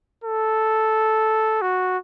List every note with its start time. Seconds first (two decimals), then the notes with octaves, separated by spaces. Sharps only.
0.24 A4
1.62 F#4